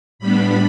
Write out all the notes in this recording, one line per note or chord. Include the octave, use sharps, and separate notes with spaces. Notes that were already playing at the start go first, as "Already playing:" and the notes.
A2 G3 B3 D4 B5